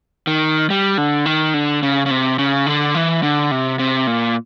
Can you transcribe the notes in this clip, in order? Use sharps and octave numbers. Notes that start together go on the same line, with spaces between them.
D#3
G3
D3
D#3
D3
C#3
C#3
C3
C#3
D3
E3
D3
C3
C3
A#2